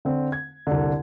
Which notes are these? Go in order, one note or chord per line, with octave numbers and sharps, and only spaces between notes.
D3 C4
G#6
C2 D3